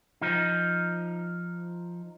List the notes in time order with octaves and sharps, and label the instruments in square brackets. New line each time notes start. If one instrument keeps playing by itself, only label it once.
[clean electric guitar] F3 D#4